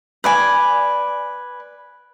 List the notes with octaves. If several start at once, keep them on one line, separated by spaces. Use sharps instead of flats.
B4 D5 G#5